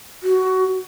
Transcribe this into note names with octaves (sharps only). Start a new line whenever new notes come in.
F#4